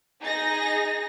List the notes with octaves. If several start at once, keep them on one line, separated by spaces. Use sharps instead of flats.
D#4 G#4 A#6